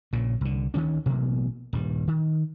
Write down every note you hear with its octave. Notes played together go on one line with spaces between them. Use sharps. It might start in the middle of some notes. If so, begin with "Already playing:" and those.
A#1 A#2 C#3
C2 D3
D2 D#3 E3 C#4
A1 B2 F#3 A#3
D#1 G2
D#3